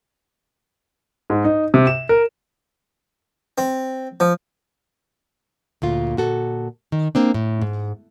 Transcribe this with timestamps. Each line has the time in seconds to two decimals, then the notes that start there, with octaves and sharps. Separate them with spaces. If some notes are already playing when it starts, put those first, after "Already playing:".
1.30 G#2
1.45 D#4
1.74 C3
1.87 E7
2.09 A#4
3.58 C4
4.20 F3
5.82 D2 A#2 F4
6.17 A#2 F#4 A4
6.92 D#3
7.15 A#3 C4 D4
7.34 A2
7.62 G#2